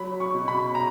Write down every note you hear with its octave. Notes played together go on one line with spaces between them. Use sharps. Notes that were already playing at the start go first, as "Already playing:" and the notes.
Already playing: F#3 B5
C#6
B2
B5
A#5